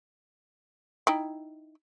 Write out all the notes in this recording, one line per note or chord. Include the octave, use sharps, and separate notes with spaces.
D#4 E4 G5